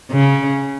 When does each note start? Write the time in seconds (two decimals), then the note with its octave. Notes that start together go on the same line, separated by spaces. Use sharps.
0.11 C#3